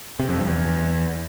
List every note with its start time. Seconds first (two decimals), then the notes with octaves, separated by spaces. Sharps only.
0.20 C3
0.29 F2
0.38 G2
0.47 E2